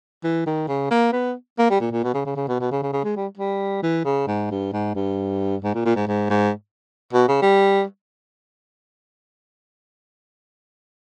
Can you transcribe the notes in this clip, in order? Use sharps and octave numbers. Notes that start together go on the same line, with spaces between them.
E3
D#3
C#3
A#3
B3
A#3
G3
A#2
A#2
B2
C#3
C#3
C#3
B2
B2
C#3
C#3
C#3
G#3
G3
G3
E3
C#3
G#2
G2
G#2
G2
G#2
A#2
A#2
G#2
G#2
G#2
B2
C#3
G3